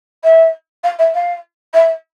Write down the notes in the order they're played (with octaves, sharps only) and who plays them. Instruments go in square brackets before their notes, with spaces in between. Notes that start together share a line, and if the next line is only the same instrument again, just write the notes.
[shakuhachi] E5
F5
E5
F5
E5